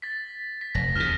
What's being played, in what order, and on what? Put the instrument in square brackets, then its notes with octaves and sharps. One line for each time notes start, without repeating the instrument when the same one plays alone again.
[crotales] A6 B6
B6
[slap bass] F1 [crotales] A#6
[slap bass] D#2 C#3 [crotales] F6